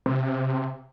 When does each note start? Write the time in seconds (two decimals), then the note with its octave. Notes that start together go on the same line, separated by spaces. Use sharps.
0.06 C3